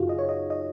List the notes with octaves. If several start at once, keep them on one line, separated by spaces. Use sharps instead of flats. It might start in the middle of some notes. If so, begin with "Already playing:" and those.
Already playing: F#2 C#3 D#4 F4 F#4 G#4
D#5
C#5
D#5
D#5